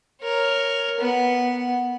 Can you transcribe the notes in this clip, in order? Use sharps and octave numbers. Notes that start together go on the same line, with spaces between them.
A#4 C#5
B3 F#5